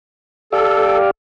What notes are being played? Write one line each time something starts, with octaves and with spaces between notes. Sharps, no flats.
G4 A4 D5 F5